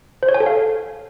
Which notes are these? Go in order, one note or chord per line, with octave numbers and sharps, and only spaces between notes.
C5
C#5
G#5
A4
F5